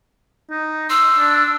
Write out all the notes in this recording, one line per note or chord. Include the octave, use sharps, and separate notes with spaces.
D#4
C6 E6
D4